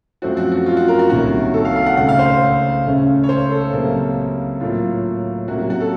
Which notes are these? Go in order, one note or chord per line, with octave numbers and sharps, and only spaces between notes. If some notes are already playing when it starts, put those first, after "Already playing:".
F#2 F3 A3 C4 F#4
F#4
F#4
F4
F#4
A#4
F#4
C2 C3 D#3 A#3 C#4 F#4
A4
F5
F5
F#5
C#2 C#3 A3 F#5
F5
C5
C5
C#2 C#3 A3 C#4
C#5
C5
A4
C#2 C3 F#3 A#3 C#4
A2 F#3 A#3 F4
C3 F#3 A#3 C#4 F#4
F#4
F#4
A4